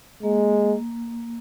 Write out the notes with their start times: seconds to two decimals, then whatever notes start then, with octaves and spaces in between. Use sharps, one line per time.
0.23 G#3 A#3